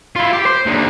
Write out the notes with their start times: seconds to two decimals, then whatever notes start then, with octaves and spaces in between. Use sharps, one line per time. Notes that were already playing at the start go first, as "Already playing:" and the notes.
0.16 E4 F4
0.33 G4
0.46 C5
0.66 D#2 D3